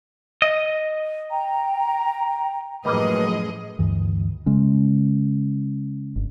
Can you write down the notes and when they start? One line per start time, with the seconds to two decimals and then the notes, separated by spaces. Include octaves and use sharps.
0.42 D#5
1.30 G5 A#5
2.85 F#2 A2 F3 G3 A#3 G#4 B4 D#5
3.79 D2 G2 E3
4.46 C#3 G#3 C#4
6.16 G1